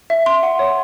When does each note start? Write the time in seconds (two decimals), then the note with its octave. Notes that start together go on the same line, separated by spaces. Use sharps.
0.10 E5
0.26 C6
0.43 F#5
0.59 C#5